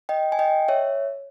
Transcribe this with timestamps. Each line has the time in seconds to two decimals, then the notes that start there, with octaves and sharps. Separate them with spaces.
0.09 D#5 G5
0.32 G#5
0.39 D#5 G5
0.68 C#5 E5